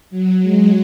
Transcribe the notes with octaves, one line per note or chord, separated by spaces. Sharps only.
F#3
G#3